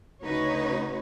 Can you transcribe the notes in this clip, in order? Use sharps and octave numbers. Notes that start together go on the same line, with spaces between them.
D2 C#3 D#4 F#4 B4 C#5